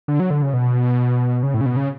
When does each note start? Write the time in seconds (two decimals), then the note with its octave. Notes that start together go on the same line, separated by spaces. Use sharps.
0.08 D3
0.20 F#3
0.30 D3
0.42 C#3
0.53 B2
1.43 C#3
1.54 A2
1.61 C#3
1.66 B2
1.76 C#3